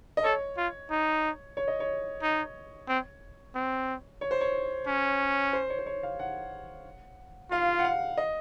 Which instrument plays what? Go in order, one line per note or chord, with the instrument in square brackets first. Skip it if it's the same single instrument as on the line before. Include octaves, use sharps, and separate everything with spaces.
[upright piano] D#5
[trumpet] A4 [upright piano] C#5
[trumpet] F4
D#4
[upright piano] C#5
D#5
C#5
[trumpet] D#4
C4
C4
[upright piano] C#5
C5
C#5
[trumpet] C#4
[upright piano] C5
C#5
C5
C#5
F5
F#5
[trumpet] F4 [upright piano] F5
[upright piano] F#5
F5
D#5